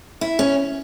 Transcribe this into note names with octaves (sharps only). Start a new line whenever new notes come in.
E4
C#4